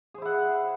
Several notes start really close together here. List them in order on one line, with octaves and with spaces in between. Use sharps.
G#4 C5 E4 F#5